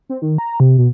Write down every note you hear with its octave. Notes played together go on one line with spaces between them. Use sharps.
C4
D#3
A#5
C3
B2